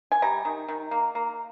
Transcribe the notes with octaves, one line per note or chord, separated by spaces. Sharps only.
G#5
G3 A#5
D#3
D#3
A#3
A#3